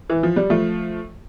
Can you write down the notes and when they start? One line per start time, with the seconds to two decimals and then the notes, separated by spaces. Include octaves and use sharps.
0.10 E3
0.23 F3
0.36 G3
0.50 F3 A3